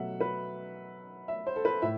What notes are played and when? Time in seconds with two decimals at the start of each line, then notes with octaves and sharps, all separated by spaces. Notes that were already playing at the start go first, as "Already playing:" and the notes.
Already playing: B2 F#3 A3 E5 F#5
0.20 B4
1.28 E5
1.47 C5
1.56 A4
1.65 B4
1.82 A2 E5